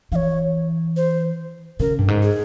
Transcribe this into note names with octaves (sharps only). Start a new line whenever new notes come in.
E3 C#5 F5
C5
C#3 A#4
G2
G#2
G#4